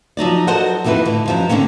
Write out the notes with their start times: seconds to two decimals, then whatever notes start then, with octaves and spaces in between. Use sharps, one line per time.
0.17 F3 F#3 D#4 D5
0.47 F#4 A4 A#4 C5 D#5 F#5
0.84 F2 D#3 E3 E4 B4
1.05 A2 D3
1.26 F#2 F3 G#3
1.49 D3 D#3 A#3 C#4